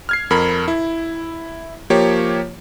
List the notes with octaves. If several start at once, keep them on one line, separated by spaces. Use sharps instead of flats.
F6 G#6 C7
F2 A#4 B5
E4
F3 A#3 G4 C#5